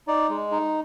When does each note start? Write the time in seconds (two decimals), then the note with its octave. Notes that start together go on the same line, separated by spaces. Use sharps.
0.07 D#4 D5
0.29 G#3
0.51 D#4